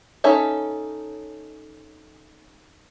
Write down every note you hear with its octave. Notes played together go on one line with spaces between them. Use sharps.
C#4 D#4 A4 C#5 E5